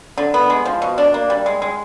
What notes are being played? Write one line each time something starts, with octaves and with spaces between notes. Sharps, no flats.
D3
B3
G#3
F3
B2
D4
A#3
G3
G#3
G#3